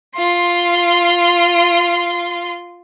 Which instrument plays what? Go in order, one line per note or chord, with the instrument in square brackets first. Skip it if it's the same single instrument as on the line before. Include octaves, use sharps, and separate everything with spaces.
[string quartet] F4 C6